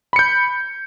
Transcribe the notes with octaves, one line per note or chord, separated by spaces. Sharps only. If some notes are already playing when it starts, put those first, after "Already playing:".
B5 G6 C#7